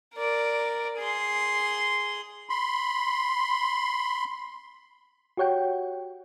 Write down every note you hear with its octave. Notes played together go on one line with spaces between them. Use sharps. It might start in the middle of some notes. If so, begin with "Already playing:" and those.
A#4 D5
G#4 C6
B5 C6
F#4 G4 C#5 F#5 G5